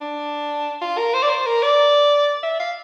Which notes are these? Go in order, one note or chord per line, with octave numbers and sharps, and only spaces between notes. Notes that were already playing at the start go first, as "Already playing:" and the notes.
D4
F4
A#4
C5
D5
C5
A#4
D5
E5
F5